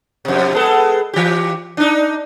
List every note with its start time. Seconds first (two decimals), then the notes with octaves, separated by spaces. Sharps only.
0.25 F2 C3
0.53 G#3 B3 A4
1.14 E3 G4
1.77 D4 D#4